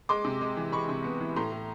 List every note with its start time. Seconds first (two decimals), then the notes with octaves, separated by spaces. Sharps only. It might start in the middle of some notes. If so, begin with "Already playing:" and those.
0.09 G#3 C6 D6
0.25 C3
0.41 G#3
0.57 E3
0.72 G#3 B5 C#6
0.89 C3
1.04 B3
1.20 E3
1.36 A2 A#5 C6
1.52 A2